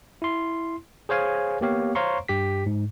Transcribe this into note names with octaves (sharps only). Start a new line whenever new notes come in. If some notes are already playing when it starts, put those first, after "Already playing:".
E4 C6
G#4 C5 C#5 F5 G#5
A#3 B3 G4 C#5 F5
C5 C#5 F5 A#5 C6 C#6
G2 G4 B6
G#2